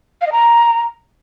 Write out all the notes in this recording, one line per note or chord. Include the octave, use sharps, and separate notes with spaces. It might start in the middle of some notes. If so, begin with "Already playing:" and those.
F5
D#5
A#5